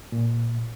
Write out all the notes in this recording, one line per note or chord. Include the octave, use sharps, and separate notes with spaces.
A#2